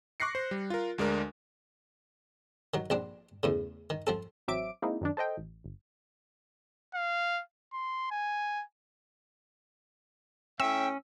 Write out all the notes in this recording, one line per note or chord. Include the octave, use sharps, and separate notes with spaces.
C#6 D6 F#6 A#6 C7 C#7
C5
G3
F4 A#4
D2 G#3 D4 A#4
D#3 F#3
A#1 C4 D4
E2 A2 C#3
D#3
F3 C4 A4
A1 F#3 C4 E5 D6 D7
G#3 A#3 C4 D#4 E4
F#2 D#3 D4
A4 C5 D#5 G5
A1
G1
F5
C6
G#5
A2 C#4 E5 G5 E6